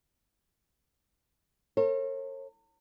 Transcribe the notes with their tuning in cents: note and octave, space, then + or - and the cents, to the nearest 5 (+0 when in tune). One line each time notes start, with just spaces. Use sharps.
A#4 -45 C#5 -40